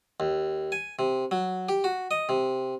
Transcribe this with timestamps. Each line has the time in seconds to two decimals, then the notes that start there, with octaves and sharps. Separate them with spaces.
0.20 D#2
0.72 G#5
0.99 C3
1.31 F#3
1.69 G4
1.84 F#4
2.11 D#5
2.29 C3